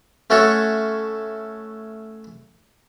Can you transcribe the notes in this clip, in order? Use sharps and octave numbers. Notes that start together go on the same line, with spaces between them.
A3 C#4 F#4 A4 C#5